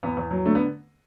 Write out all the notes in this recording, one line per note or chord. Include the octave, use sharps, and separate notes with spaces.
E2 B3
E2
F#3
D3 A3
B3